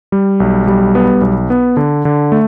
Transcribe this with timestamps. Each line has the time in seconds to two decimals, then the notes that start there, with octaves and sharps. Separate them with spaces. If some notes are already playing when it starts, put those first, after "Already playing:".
0.12 G3
0.40 B1
0.67 G3
0.95 B3
1.21 B1
1.50 B3
1.77 D3
2.05 D3
2.32 A3